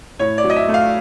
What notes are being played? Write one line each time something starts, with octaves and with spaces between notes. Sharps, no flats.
A2 C#5
D5
F#3
D#5
E5
A3
F5